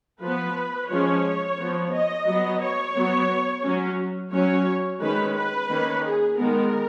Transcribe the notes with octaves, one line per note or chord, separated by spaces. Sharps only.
F3 B3 B4
F3 G#3 C#4 C#5
F3 B3
D#5
F#3 B3
C#5
F#3 B3
F#3 C#4
F#3 C#4 C#5
D#3 G#3 C#4 B4
B4
D#3 A#3 C#4
G#4
D#3 G#3 B3 A#4